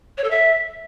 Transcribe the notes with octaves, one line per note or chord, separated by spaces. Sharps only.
C#5
A4
E5